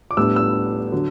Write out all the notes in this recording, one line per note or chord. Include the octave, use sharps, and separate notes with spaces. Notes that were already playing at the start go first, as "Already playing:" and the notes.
D6
A2 G3 B3 D4 E6
E6
D3 F#3